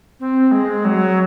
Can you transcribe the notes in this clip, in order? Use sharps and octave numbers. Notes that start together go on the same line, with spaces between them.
C4
G#3
F#3